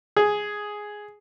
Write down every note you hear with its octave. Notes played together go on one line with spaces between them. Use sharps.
G#4